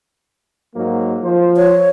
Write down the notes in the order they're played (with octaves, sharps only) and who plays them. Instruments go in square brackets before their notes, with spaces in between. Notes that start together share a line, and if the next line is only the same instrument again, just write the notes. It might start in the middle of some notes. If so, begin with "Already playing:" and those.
[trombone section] G#2 F#3 A#3
F3 C5
[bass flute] C#5